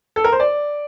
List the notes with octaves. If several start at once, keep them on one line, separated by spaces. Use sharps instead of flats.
A4
A#4
C5
D5